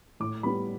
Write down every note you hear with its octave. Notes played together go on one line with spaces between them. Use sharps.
A2 D6
G3 B3 B5